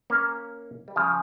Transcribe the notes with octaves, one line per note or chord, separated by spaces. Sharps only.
A#3 C#4
G3
C#3 F3